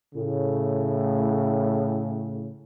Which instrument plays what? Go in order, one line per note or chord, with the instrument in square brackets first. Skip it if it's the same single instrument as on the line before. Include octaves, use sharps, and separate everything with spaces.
[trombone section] A2 C#3